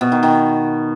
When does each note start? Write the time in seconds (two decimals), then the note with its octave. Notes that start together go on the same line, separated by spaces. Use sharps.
0.01 B2
0.12 D#3
0.23 D#3